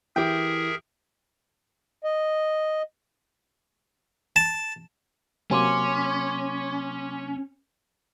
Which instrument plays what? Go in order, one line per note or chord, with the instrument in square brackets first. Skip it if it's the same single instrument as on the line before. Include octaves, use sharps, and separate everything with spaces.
[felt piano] E3 [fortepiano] G4 G5 [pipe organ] G#4 A#4 E5
[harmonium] D#5
[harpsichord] A5
[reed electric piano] C3 F#3 A#3 [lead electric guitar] C#4 [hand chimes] G#5 C6 D6